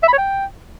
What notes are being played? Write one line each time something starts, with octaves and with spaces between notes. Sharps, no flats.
E5
B5
C#5
G5